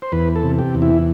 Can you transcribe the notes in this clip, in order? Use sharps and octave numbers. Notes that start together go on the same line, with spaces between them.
C5
E2 B4
A4
C3
G4
E2
E4